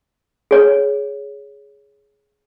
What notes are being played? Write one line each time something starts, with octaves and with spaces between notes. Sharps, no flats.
G#4 C#5